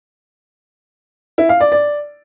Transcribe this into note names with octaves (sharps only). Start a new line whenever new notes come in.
E4
F5
D5
D5